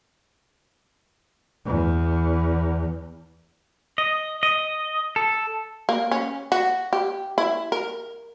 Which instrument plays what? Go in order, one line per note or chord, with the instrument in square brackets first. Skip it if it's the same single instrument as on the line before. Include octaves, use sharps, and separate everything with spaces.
[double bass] E2
[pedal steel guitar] D#5
D#5
A4
[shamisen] A#3
C#4
F#4
G4
E4
A#4